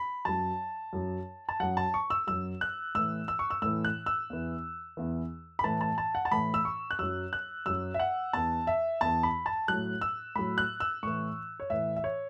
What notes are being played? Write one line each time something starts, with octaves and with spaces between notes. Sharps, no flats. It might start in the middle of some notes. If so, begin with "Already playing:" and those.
Already playing: B5
F#2 F#3 A5
F#2 F#3
A5
F#2 F#3 F#5
A5
C#6
E6
F#2 F#3 E6
F#6
A2 E3 E6
E6
C#6
E6
A2 E3 E6
F#6
E6
E2 E3
E2 E3
B5
A2 E3 A5
A5
A5
F#5
A5
A2 E3 B5
E6
C#6
F#6
F#2 F#3 E6
F#6
F#2 F#3 E6
E5
F#5
E2 E3 A5
E5
E2 E3 A5
B5
A5
A2 F#3 F#6
E6
A2 F#3 B5
F#6
E6
A2 E3 C#6
C#5
A2 E3 E5
E5
C#5